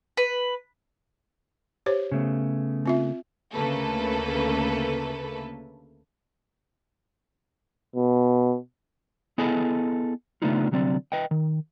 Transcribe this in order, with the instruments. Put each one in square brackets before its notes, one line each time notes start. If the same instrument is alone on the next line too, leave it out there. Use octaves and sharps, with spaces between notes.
[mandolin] B4
[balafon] G4 C5 C#5
[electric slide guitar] C#3 A3 B3
[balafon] C4 F4 E5
[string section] D2 C#3 A3 A#3 A4 B4
[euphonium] B2
[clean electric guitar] B3 E4 G#4 A4 D#5 G#5
C#3 A3 B3 D4 D#4 F4
C2 D3 F#3 C4 D5
B4 D#5 G5
D#3